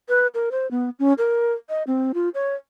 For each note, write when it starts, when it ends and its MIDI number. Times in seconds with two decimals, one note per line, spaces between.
0.09 0.27 71
0.34 0.49 70
0.51 0.69 72
0.71 0.90 59
0.99 1.13 61
1.18 1.53 70
1.69 1.83 75
1.87 2.12 60
2.14 2.29 65
2.34 2.54 73